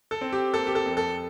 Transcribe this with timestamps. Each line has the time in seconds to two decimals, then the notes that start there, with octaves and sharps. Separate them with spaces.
0.11 A4
0.21 C4
0.33 G4
0.53 A#3 A4
0.67 G4
0.75 A4
0.86 F2
0.97 A4